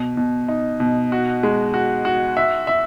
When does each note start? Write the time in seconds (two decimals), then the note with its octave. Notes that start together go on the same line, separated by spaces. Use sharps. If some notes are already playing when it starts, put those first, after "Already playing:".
Already playing: B2
0.17 B2
0.48 D#4
0.80 B2
1.12 F#4
1.43 G#3
1.74 F#4
2.05 F#4
2.37 E5
2.67 E5